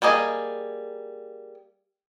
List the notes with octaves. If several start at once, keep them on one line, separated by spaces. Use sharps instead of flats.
G3 A#3 G#4 D#5